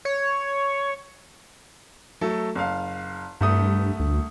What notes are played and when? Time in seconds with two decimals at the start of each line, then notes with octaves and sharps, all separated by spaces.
0.05 C#5
2.21 F#3 A3 A4
2.55 F#1 F5
3.41 C2 G2 A3 D#6
4.00 D2